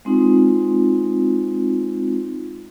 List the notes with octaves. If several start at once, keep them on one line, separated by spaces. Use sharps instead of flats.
G#3 C4 D#4 F4